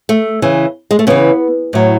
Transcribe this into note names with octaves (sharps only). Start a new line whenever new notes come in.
A3
C#3 E3
G#3
A3
C#3 E3 B3
A2 F#3